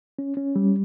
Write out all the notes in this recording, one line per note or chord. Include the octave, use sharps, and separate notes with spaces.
C#4
C#4
G3